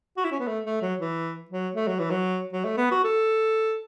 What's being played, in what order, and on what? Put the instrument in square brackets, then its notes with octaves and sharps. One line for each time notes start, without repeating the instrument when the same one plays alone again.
[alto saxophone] F#4
E4
C#4
B3
A3
A3
F#3
E3
F#3
A3
F#3
E3
F#3
F#3
A3
B3
F#4
A4